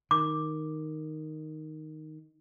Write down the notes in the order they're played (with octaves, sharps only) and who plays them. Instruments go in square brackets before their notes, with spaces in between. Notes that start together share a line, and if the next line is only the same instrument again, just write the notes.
[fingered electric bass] D#3 [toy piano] D6